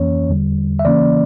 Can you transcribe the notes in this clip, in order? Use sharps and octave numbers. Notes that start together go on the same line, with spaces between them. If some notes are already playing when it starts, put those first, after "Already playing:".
Already playing: F2 E3 A#3 C#4 C#5
E2 D3 G3
E5
C#3 E3 A#3 C#4 D5